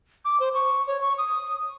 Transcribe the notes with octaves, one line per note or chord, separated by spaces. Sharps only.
D6
C5
C#6
C#5
C#6
D#6